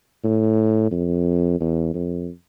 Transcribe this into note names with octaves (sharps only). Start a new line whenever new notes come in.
A2
F2
E2
F2